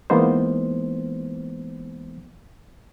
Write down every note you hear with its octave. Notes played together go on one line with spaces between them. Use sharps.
E3 G#3 A#3 B3 D#4 C5